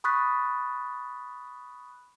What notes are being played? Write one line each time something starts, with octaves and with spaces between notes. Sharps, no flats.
B5 C#6 D#6 F#6 A6 B6